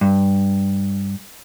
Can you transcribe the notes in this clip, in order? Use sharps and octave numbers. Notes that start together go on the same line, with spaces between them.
G2